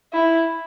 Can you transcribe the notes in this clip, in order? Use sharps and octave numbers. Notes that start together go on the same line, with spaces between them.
E4